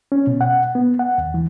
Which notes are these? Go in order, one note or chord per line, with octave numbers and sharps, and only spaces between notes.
C#4
B2
F#5
B3
F#5
D#2
E3